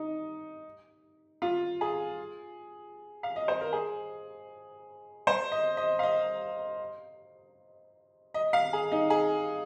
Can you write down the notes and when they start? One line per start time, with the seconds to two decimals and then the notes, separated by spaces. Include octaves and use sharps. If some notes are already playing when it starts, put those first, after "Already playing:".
Already playing: D#4
1.42 F4
1.81 G#4
3.23 F5
3.36 D#5
3.48 C5
3.61 A#4
3.73 G#4
5.27 C5
5.52 D#5
5.77 D#5
5.99 F5
6.03 D#5
8.34 D#5
8.53 F5
8.73 G#4
8.92 D#4
9.10 G#4